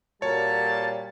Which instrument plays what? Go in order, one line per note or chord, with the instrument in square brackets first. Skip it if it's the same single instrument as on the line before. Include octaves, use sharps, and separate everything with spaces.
[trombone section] A#2 G3 [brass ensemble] F#4 A4 A#4 [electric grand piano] C#5 [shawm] A5